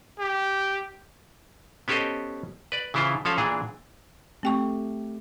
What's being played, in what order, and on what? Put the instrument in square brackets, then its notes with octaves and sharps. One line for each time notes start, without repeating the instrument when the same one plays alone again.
[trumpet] G4
[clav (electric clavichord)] B3 C#4 G4 A4 C5 D#5
B4 D5
C#3 E3 E4 F4 C5
F3 C#4 A4 F5
A#2 E3 D4 G#4
[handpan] A3 G4 [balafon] C4 G5 C#6